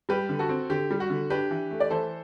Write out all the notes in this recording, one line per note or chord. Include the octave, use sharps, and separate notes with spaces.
G3 G4 B4
D3
F#4 A4
C4
D3 G4
G3
F#4
D3
D4 G4 B4
E3
A3
D5
E3 A4 C5